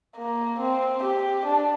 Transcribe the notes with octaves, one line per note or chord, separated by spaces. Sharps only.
A#3
C4
G4
D4